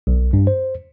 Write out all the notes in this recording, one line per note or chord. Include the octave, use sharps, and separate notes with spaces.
B1
G2
C5